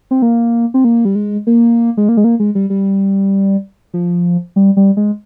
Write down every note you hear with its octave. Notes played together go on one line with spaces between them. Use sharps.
C4
A#3
C4
A#3
G3
G#3
A#3
G#3
A#3
G#3
A#3
G#3
G3
G3
F3
G3
G3
G#3